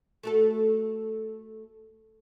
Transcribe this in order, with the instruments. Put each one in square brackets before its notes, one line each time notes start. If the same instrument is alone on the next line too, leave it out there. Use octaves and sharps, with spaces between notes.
[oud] A3 F#4 A4